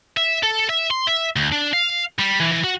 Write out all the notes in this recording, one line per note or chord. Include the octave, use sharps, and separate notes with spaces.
E5
A4
E5
C6
E5
D2
D4
F5
G3
E3
E3
F#4